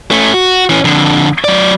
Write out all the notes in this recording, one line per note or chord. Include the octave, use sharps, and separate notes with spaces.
A3 C#4
F#4
E3 C#4
F2 D3
F#3 D5